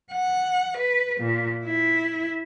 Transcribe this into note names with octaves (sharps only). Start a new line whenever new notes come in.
F#5
B4
A#2
E4